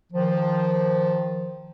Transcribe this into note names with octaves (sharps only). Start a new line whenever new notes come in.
D#3 F3